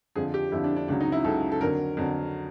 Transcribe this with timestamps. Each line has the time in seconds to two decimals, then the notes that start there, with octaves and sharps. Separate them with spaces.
0.16 F2 D3 F3 G#4
0.34 G4
0.52 F2 D3 F3 E4
0.64 D4
0.77 D4
0.88 C#2 C#3 F#3 D4
1.00 D#4
1.12 E4
1.24 C#2 C#3 F#3 A4
1.52 A4
1.61 F2 D3 F#3 A#4
1.97 F2 D3 F#3